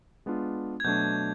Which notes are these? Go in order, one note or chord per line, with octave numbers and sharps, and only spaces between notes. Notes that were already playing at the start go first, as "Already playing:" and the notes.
G#3 B3 D4 F4
G#6
B2 F#3 A3 D4 G6